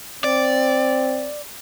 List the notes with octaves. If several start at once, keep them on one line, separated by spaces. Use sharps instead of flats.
C4 D5